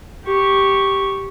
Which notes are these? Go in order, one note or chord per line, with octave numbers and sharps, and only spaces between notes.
G4 C#6